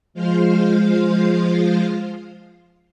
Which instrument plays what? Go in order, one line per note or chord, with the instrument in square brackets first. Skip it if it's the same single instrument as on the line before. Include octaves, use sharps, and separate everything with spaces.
[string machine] F3 G#3 F4 C5 F5